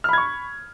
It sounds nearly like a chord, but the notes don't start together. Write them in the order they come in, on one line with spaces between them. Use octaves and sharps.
F6 B5 G#6 C#6